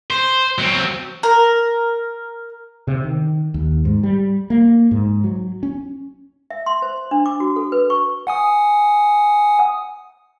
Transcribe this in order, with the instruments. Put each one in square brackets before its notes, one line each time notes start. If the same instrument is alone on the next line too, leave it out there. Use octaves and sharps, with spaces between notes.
[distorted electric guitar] C5
F#3 C4
[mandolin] A#4
[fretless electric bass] C3
D#3
D#2
G#2
G3
A#3
G#2
F#3
C#4
[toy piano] E5
C6
C5
D4
D6
F#4
A4
B4
C#6
[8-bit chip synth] F#5 G#5 D#6